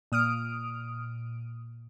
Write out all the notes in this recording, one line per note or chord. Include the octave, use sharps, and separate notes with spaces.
A#2 D#6 F6 D7